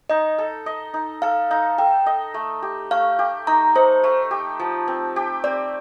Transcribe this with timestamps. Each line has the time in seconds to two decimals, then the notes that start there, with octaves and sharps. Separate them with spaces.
0.10 D#4 D#5
0.38 A4
0.66 D#5
0.94 D#4
1.22 A4 F5
1.51 D#4 F5
1.78 A4 G5
2.06 D#5
2.34 A3
2.62 G4
2.91 A3 F5
3.19 G4
3.47 D#4 A#5
3.75 D#4 C5
4.04 A3
4.31 G4
4.59 F3
4.88 C4
5.16 G4
5.44 C4 D5